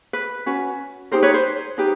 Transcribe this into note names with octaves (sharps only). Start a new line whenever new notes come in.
B4
C#4 F#4 B4
D#4 G4 A#4 C5
B4 C#5
C5
D#4 G4 B4